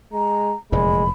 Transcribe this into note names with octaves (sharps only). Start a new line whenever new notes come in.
G#3 A#5
F1 E2 A#2 G#3 B5